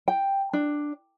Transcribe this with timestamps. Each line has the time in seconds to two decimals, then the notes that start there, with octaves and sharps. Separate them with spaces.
0.08 G5
0.53 D4